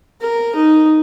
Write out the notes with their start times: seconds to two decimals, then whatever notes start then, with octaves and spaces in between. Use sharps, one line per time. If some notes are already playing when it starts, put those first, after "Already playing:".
0.21 A#4
0.55 D#4